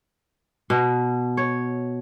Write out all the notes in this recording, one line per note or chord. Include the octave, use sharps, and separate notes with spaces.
B2
C#5